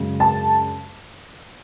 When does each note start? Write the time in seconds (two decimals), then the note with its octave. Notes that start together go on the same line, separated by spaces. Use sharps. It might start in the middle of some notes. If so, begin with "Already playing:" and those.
Already playing: F#2 C#3 G#3
0.20 A5